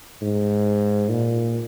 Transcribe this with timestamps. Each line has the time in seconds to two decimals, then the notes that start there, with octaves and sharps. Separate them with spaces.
0.22 G#2
1.10 A#2